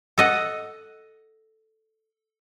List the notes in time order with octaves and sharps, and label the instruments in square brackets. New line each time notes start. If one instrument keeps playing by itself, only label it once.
[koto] A4 D#5 F#5